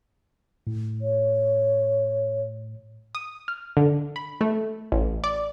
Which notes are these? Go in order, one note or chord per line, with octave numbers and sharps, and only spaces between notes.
A2
C#5
D#6
F6
D3
B5
A3
A1
D5